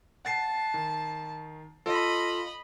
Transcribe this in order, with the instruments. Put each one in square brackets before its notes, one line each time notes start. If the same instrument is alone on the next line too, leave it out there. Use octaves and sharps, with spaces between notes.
[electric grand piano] F#5 A6 C7 [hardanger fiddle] A5
[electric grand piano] D#3
[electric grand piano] F4 A4 [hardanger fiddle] D#5 B5